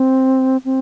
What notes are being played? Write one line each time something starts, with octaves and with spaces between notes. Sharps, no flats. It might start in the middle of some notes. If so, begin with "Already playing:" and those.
Already playing: C4
C4